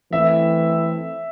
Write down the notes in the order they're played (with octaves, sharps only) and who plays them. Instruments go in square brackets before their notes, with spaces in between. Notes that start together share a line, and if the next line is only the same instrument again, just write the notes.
[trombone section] E3 A3 C4 E4 [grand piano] E5